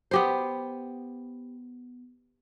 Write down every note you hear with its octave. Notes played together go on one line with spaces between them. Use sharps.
B3 G4 C5